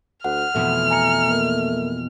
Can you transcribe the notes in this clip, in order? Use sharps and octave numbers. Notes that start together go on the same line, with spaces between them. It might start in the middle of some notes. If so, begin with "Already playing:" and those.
D2 F#5 F6
F2 B2 E3 A3
G#5 A#5 C#7
A#3 A#4